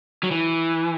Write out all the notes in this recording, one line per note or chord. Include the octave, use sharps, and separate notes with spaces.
F#3
E3